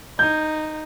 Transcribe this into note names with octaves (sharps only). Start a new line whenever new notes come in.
D#4 G6